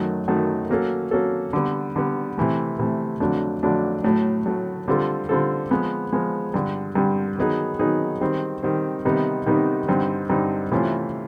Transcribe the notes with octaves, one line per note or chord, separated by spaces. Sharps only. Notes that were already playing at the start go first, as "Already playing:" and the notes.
Already playing: F#2 D#3 F#3 A3
F#2 D#3 F#3 A3
F#3 A#3 C#4 F#4 A4
F#3 A#3 C#4 F#4 A4
D3 G3 B3
D3 G3 B3
C3 E3 A3
C3 E3 A3
F2 D3 F#3 A3 D4
F2 D3 F#3 A3 D4
A2 F#3 A3
A2 F#3 A3
D3 G3 C4 F4 A4
D3 G3 C4 F4 A4
F3 G#3 B3
F3 G#3 B3
G2 D3 G3
G2 D3 G3
D#3 F#3 B3 D#4 G#4
D#3 F#3 B3 D#4 G#4
D#3 G3 C4
D#3 G3 C4
C3 D#3 G3 B3 D#4
C3 D#3 G3 B3 D#4
G2 D3 G3 C4 D#4
G2 D3 G3 C4 D#4
C3 E3 A3 C#4 F4